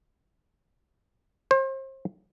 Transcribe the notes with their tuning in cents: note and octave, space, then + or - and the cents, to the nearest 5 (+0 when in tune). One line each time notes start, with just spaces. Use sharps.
C5 +35